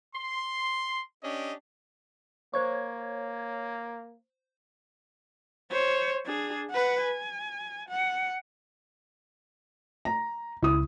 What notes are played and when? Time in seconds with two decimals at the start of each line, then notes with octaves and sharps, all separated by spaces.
0.15 C6
1.23 C#4 D4 G4 D#5
2.54 A#3 C5 C#5 C#6 G#6
5.72 C5 C#5
6.25 D4 G#4
6.70 B4 F#5
7.02 G#5
7.89 F#5
10.05 A#5
10.62 C#2 E4 D#6